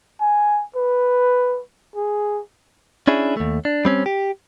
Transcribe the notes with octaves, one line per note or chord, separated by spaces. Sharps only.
G#5
B4
G#4
C#4 D4 E4 G#4
D#2 A3
D4
G3 C4 C#4
G4